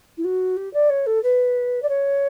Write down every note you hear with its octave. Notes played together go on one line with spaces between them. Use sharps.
E4
F#4
G4
D5
C#5
A4
B4
D5
C#5